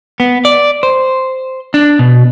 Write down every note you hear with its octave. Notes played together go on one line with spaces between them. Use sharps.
B3
D5
C5
D4
B2